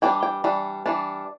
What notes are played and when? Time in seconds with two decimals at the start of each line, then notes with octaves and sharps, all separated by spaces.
0.02 E3 G3 D4 G5
0.23 G5
0.44 E3 G3 D4
0.86 E3 G3 D4